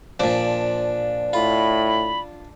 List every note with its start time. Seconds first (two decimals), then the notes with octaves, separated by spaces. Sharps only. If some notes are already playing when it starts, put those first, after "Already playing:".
0.20 A#2 F3 D4
1.33 A2 F4 B5